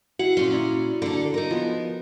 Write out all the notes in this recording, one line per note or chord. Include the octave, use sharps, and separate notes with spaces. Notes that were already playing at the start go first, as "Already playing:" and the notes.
E4 F#4 F#5
A#2 C#4 C6
E4 D5 A#5
D3 A#3 A4
D#4 A#4
F3 B3